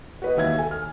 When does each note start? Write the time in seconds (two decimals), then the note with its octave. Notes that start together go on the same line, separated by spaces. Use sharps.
0.22 F#4 B4 D#5
0.36 D#2 D#3 E5 G#6
0.58 A4 G#5
0.71 F6